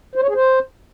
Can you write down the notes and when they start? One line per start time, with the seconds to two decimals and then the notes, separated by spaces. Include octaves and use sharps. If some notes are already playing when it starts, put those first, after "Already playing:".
0.16 C5
0.22 C#5
0.28 G#4
0.35 C5